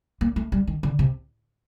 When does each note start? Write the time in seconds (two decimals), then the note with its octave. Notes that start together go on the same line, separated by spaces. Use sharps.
0.21 A#3
0.36 A3
0.52 G3
0.67 D#3
0.83 D3
0.99 C3